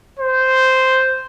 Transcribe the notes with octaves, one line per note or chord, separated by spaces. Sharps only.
C5